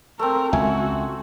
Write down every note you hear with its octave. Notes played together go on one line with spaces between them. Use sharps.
A3 C4 A#4
C#2 F#4 E5 G#5